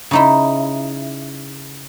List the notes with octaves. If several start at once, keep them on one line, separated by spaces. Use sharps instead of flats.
C#3 D#4 E4